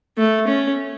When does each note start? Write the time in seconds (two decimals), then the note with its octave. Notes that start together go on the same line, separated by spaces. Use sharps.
0.18 A3
0.47 C#4